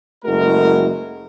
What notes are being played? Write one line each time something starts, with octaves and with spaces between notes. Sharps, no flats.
F#1 G#3 A3 E4 F#4 A#4